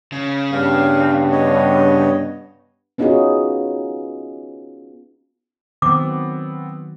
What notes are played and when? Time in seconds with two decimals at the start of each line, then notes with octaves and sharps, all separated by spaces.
0.12 C#3
0.52 G2 B3 F5
1.32 C#5 D#5
2.98 B3 C#4 D#4 F4 F#4 G#4
5.82 D#3 F#3 B3 C4 D6